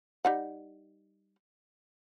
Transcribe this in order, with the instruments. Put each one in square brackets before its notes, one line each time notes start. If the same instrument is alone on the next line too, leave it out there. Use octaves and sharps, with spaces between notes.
[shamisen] G3 D#4 F#5